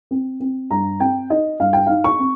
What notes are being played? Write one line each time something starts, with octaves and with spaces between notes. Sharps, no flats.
C4
C4
G2 A#5
C4 G5
D#4 D#5
G2 F5
G5
D#4 F5
C#6
C4